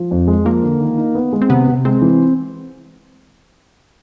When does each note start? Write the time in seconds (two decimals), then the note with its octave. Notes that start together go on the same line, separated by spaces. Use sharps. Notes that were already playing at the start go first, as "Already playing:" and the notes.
Already playing: F3
0.11 F2
0.27 G#3
0.45 F3 A#3
0.63 D3
0.80 D#3
0.98 D#4
1.15 B3
1.33 G#3
1.41 C4
1.50 C3 B3
1.68 C3
1.85 G#3 C4
2.02 E3